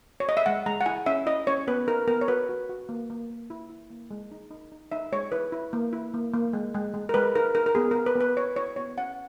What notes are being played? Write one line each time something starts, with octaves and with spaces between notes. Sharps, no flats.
C#5
D#5
E5
G#3 F#5
G#3 A#5
F#5
E4 G#5
C#4 E5
E4 D#5
C#4 C#5
B3 B4
D#4 A#4
B3 A#4
C#5
F#4 B4
F#4
F#4
A#3
A#3
A#3
E4
E4
A#3
G#3
D#4
D#4
D#4
D#4 E5
G#3 C#5
E4 B4
E4
A#3
E4
A#3
A#3
G#3
G#3
G#3
A#4
G#3 B4
D#4 A#4
D#4 A#4
A#4
B3 G#4
B3 A#4
B4
B3
B4
E4 C#5
E4 C#5
B3 C#5
C#4 F#5